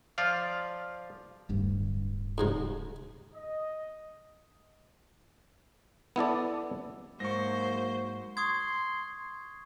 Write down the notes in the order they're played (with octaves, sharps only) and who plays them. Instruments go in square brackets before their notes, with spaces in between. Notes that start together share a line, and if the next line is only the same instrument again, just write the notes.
[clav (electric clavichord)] F3 F4 D5 F5
[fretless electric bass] D1 D2 G2
[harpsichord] F2 G#2 C3
[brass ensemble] D#5
[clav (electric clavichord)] B3 E4 A4 D5
[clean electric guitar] G#2 [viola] F#3 C5 [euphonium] A#3 [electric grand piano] C#6 A#6
[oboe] C6 [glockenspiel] C#6 D#6 G#6